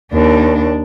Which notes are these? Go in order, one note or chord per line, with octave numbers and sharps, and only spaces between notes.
D#2 D4